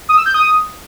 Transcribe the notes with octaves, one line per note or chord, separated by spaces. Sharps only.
D#6
E6
G6
D#6